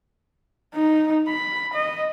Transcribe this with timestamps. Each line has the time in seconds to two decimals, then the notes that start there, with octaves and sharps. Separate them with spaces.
0.74 D#4
1.28 B5
1.74 D#5